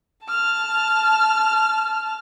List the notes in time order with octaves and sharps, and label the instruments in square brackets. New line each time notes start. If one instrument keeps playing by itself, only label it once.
[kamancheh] A5 F6